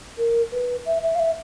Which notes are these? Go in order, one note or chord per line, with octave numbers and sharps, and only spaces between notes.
A#4
B4
E5
E5
F5
E5